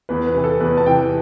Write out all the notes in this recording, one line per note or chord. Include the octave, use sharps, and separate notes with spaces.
E2 B4
B4
C3 E3
A4
E2 B4
A5
C3 E3 G5